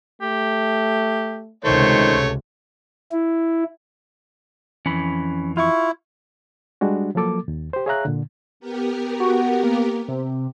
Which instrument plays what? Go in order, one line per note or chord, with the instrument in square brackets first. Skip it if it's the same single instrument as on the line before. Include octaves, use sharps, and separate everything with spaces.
[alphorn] A3 [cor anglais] G4
[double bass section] C#2 C3 [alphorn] D#3 [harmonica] A3 C#5 [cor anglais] C5
[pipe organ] E4
[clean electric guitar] F2 E3 [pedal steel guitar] C#4 B5
[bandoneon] E4 [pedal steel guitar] F4 C#6
[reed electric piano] G3 G#3 D4 F#4
F3 F#3 A#3 A4 D6
D#2
G4 C5
G#4 C#5 E5 F5 A#5 F#6
A#2 D3
[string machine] B3 G4 A#4
[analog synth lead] F#4
A#3
C3